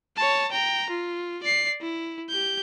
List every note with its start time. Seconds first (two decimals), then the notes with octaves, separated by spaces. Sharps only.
0.17 C#5 A5
0.52 G5 A#5
0.90 F4
1.43 D5 C7
1.81 E4
2.30 G4 G6